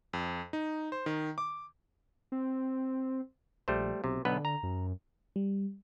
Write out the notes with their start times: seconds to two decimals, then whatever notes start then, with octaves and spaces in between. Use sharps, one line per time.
0.13 F2
0.53 D#4
0.92 C5
1.06 D#3
1.38 D6
2.32 C4
3.68 A#1 G3 A3 C5
4.04 B1 C3
4.25 B1 D3 B3 B4
4.45 A#5
4.63 F#2
5.36 G3